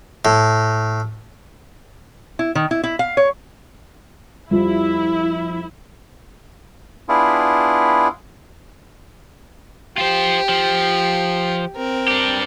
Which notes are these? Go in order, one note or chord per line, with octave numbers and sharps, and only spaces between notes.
A2
E4
D#3
E4
E4
F5
C#5
F2 F3 G3 E4
B3 D4 E4 F4 G#4
F4 G4 C5
F3
C4 A#4
D4 G4